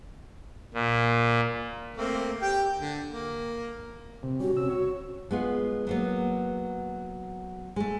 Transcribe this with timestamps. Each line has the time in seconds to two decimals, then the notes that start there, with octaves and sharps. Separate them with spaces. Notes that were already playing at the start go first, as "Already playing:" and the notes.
0.74 A#2
1.97 A3 A#3 C4
2.42 G4 G5
2.80 D3
3.08 A#3
4.23 C3
4.40 G3 C#4 F#4
4.57 C3 C#4 E6
4.70 C#5
5.31 G#3 B3 F4
5.87 F#3 A#3 B3
7.76 G#3 A3